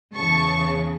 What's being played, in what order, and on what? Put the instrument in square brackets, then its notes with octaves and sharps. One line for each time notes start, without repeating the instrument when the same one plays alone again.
[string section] E2 C#3 E3 A5 C#6